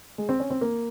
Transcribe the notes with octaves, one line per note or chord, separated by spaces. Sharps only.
G#3
C4
C#4
C4
A#3